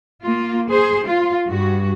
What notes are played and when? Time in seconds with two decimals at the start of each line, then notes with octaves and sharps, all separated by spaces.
0.23 A#3 F4
0.69 G#4 C5
1.06 F4
1.49 G2 F#4